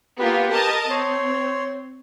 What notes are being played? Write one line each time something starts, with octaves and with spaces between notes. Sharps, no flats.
A#3 B3 F4 G4 B4
A#4 D#5 A5
C4 C#5 C6